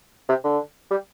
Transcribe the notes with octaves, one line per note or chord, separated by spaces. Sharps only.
C3
D3
G3